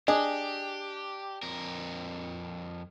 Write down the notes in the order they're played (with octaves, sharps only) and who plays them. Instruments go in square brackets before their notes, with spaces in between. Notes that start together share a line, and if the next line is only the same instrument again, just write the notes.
[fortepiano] D4 [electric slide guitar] G4 [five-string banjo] G#4 D#5
[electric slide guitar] F2 A#4